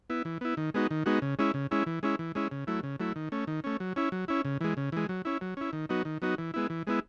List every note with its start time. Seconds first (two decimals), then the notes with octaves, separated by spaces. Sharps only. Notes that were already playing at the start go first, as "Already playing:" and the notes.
0.10 B3 E4
0.25 E3
0.41 B3 E4
0.57 D#3
0.74 G#3 B3 D#4 F#4
0.91 D#3
1.06 G#3 B3 D#4 F#4
1.22 C#3
1.39 G#3 C#4 E4
1.54 C#3
1.71 G#3 C#4 E4
1.86 E3
2.03 G#3 C#4 E4
2.19 E3
2.35 G#3 C#4 E4
2.51 C#3
2.67 F#3 A3 E4
2.83 C#3
3.00 F#3 A3 E4
3.16 D#3
3.32 A3 C#4
3.47 D#3
3.64 A3 C#4
3.80 F#3
3.96 C#4 E4
4.12 F#3
4.28 C#4 E4
4.45 C#3
4.61 E3 G#3
4.77 C#3
4.92 E3 G#3
5.09 F#3
5.25 C#4 E4
5.41 F#3
5.57 C#4 E4
5.73 D#3
5.89 F#3 B3 D#4 F#4
6.05 D#3
6.22 F#3 B3 D#4 F#4
6.38 E3
6.54 G#3 B3 E4
6.70 E3
6.87 G#3 B3 E4